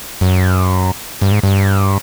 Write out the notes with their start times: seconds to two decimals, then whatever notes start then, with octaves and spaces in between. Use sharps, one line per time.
0.21 F#2
1.22 G2
1.32 G#2
1.43 G2